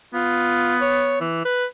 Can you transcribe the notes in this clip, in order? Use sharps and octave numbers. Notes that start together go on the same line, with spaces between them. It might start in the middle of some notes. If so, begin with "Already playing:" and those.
B3 F4
C#5
E3
B4